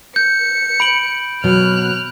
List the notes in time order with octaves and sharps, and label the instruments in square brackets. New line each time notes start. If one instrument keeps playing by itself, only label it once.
[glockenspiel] G6 [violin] C#7
[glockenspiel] B5 D7 F#7
[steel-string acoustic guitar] B2 F#3 [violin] F6 F#6